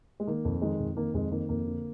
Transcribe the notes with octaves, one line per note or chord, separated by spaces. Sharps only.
G#3
D#3 A#3
F2
D#3 G#3
F2
D#3 A#3
F2 G#3
D#3 A#3
F2 A#3
D3